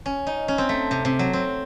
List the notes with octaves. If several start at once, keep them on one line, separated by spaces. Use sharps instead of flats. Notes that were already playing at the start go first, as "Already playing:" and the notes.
C#4
D#4
C#4
C4
A3
C3
C3
F#3
C4